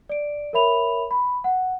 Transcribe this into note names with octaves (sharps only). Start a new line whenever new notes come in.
D5 D7
A#4 C#5 E5 B5 F7
B5
F#5